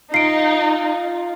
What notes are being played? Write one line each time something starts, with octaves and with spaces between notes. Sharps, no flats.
D#4 F4 C7 D7